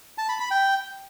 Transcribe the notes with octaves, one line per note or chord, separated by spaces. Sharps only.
A5
B5
B5
G5